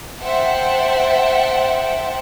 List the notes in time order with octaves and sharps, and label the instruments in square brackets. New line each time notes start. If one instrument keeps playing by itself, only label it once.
[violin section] C5 E5 F#5 G5 A5